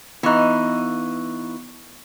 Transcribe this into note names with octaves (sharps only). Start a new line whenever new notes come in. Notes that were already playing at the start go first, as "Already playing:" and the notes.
E3 B3 D#4 C#6 F#6